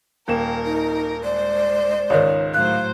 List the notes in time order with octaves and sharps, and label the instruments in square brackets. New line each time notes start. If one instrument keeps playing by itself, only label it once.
[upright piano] D#1 A#3 E7 [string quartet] A#4 [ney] G5
[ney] D#4
[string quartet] G#3 C5 [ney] D5
[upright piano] C#2 G#2 D#3 [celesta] C#5
[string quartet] A2 F#3 C5 [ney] F5 [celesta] F#6